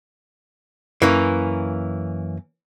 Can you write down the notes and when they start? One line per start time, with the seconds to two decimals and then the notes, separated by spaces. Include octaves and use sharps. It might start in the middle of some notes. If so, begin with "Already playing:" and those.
1.02 F#2 E3 A#3 C#4